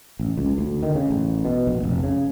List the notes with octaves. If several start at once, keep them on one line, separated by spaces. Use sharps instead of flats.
A1
C#2
D2
D#3
C#3
A1
B2
A#1
F1
C#3